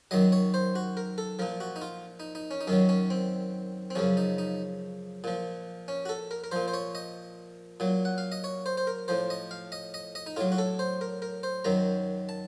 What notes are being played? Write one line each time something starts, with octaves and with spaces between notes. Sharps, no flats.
F#2 D#3 F#3 D#5
C#5
C5
F#4
A#4
A4
A#2 F3 A#4
F#4
D#4
F4
D#4
D#4
C#4
D#4
F#2 D#3 F#3 C#4
C#4
C4
C4
F#2 C#3 F3 C#4
D#4
D#4
A#2 F3
C#4
F#4
A4
A#4
A#4
A#2 F3 C5
C5
C#5
D#5
A#2 F#3
F#5
F5
D#5
C#5
C5
C5
A#4
A2 F3 C5
D#5
F5
D#5
D#5
D#5
D#4
A2 F#3 F4
F#4
A4
C5
A#4
A#4
C5
F#2 D#3 F#3 A#5
A5